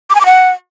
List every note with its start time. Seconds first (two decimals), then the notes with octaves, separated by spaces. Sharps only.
0.10 D6
0.15 G#5
0.20 D6
0.26 F#5